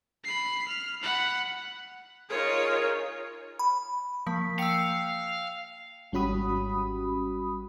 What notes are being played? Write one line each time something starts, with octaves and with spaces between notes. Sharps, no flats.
B5 C7
F6
F#5 B5
D#4 F4 G#4 A#4 C#5
B5
F3 A#3 B6
F5 G5 E6 C#7
G#1 G3 C#4 F#4 B5 D#6